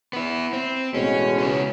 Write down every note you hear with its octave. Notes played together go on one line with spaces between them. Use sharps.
B3 E4
C4
A1 B2 G#3 C#4
C#2 C#4